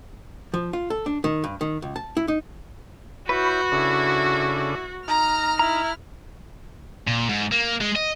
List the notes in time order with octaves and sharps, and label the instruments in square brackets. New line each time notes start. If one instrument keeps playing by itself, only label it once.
[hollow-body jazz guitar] F3
F4
A4
D4
D#3
G2
D#3
C#2
A5
E4
D#4
[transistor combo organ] E4 C#5 B5 [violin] F#4 [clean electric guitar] B4 [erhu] G6
[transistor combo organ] C#3 D4 A4 [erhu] E4
[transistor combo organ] D#4 [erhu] A#5 [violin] F6
[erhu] E4 [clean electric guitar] A#5
[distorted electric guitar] A#2
G#2
A#3
G#3
D#5